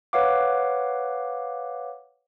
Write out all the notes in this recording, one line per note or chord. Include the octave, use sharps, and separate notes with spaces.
B4 C#5 F5 F#5 D6